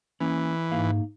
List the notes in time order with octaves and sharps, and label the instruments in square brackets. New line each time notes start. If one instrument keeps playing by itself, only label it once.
[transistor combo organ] E3 [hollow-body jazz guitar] A#3 C#4
[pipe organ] G#2 [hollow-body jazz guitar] A#3 G#4 F5